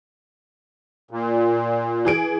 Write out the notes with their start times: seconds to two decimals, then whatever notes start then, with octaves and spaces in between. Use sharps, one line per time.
1.11 A#2
2.05 E3 G#4 D7